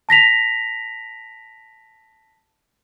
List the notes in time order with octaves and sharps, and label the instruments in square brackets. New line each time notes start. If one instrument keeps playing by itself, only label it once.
[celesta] A5 A#6 B6 F7